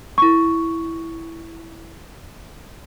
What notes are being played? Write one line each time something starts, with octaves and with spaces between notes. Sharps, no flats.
E4 C#6